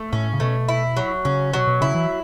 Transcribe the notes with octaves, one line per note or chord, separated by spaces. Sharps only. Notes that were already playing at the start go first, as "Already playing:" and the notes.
Already playing: A3
A2 C#4
C#3
B2 A3
E4
F#3
C#3 C#4
B2 F#3
B2
C#3 E4
E3